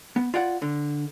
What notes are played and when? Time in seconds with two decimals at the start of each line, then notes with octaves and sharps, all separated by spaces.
0.16 B3
0.34 F4 D5 F#5
0.62 D3